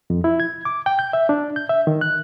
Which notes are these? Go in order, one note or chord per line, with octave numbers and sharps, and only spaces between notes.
F2
E4
G#6
D6
G5
G6
E5
D4
G6
E5
D#3
F#6